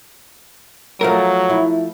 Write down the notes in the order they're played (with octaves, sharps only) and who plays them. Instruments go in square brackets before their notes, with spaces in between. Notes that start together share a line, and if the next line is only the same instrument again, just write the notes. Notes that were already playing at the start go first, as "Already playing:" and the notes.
[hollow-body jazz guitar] F3 A3 A#4 [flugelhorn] F#3
[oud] E4